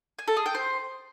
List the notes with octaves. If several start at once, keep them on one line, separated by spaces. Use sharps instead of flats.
G#5
A4
G#4
G5
C5